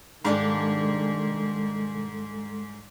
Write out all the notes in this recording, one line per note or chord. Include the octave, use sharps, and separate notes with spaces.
G#2 D#3 G3 G#3 D4 A4 F5